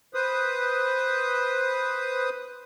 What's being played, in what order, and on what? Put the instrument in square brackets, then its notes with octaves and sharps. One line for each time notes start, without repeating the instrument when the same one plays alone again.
[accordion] B4 C5 D#6